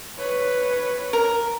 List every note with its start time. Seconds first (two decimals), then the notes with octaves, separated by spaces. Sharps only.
0.18 B4 C#5
1.13 A#4